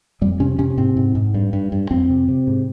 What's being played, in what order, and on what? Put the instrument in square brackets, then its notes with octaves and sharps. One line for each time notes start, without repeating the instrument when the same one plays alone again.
[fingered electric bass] F2 G3
C3 C#4
C3 C#4
G#2 C4
G#2
G#2
G2
G2
G2
F2 C4
C3
C3
G#2